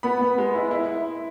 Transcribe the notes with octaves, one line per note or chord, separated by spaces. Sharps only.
B3 B5
B3
G#3
E4
E4